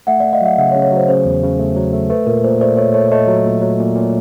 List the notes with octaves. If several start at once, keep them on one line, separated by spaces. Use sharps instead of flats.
A3 E5 F#5
A3 D5 E5
D#5 F5
F#3 E5 F#5
C#3 E5 F#5
C#5
C#3
C#5
F#3 C5
C#3 C5
E2
C#3
A3
F#3
A3
A3 B4
A#2 A#4
A#2 C5
A3 C5 D5
A3 C#5
A3 C#5
A3 C#5 D#5
F#3
A#2
F#3
A#2
A#2